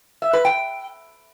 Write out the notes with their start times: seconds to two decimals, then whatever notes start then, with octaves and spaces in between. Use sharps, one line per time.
0.22 E5
0.33 B4
0.45 G5